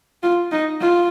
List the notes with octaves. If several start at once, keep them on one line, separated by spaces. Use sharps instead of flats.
F4
D#4
F4